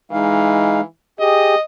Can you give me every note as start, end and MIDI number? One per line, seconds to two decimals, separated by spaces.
0.11 0.83 52
0.11 0.81 56
0.11 0.81 63
0.11 0.81 77
1.20 1.55 67
1.20 1.55 68
1.20 1.62 75